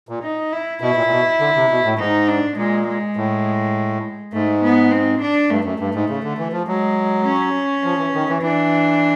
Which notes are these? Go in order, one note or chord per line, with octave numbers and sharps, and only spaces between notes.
A#2
D#4
E4
B2 E4
A#2
A#2
B2
D3
C3
B2
A2
G#2 D#4
D4
A#2 G#3
G#3
A2
G#2 A3
B3
C4
D4
G2 A3
F#2
G2
G#2
C#3
D3
E3
F3
F#3 G#3
C#4
F3
E3
D#3
E3
E3 D4